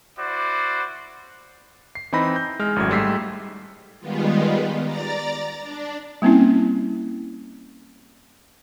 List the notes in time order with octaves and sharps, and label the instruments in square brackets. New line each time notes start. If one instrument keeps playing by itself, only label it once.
[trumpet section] E4 F#4 C5 D5
[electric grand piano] C7
E3 C4 D#4 B5 A#6
G6
G#3 F6
G#1 F#2 A2 F#3 G#6
G#2 G3 A3 E6 B6 C7
[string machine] D#3 G3 G#3 B3 F4
D5 A#5 A6
D4
[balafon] G3 A#3 C4 C#4 E4